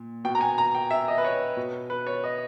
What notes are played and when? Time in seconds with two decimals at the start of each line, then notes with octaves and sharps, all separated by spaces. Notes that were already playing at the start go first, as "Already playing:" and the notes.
Already playing: A#2
0.24 B2 G5
0.35 A#5
0.41 G#5
0.58 A#5
0.75 G5
0.91 E5
1.08 D#5
1.18 B4
1.25 C#5
1.57 B2
1.90 B4
2.07 C#5
2.24 D#5